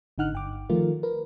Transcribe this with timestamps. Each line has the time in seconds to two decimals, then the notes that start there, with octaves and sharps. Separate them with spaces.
0.18 G#1 D3 D#4 F#5 F6 F#6
0.33 G1 G5 D6
0.69 D#3 F3 A3 F4 A#4
1.03 A#4 B4